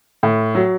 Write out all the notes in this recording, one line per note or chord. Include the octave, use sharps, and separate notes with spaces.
A2
F#3